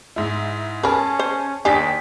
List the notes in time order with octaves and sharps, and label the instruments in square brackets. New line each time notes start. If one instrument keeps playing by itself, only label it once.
[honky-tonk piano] G#2 E4
[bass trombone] C#4 [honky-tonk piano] G#4 A5 [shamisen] A#4 B4
[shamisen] C5
[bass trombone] D#2 [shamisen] D4 G4 G#5 [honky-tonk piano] G5 D#6 B6